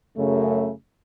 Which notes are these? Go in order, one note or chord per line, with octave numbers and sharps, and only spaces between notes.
F#2 C#3 A3